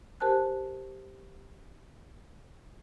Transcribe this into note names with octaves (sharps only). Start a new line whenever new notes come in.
G4 A#4 C5 G#5 A5 F#6